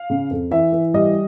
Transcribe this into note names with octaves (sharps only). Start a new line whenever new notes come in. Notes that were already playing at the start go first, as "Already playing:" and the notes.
Already playing: F5
C#3
F2
E3 E5
E3
G3 D#5